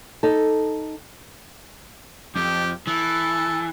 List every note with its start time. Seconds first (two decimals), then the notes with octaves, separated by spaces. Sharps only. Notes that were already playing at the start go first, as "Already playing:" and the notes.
0.23 D#4 A4
2.36 F2 G4
2.87 E3 A4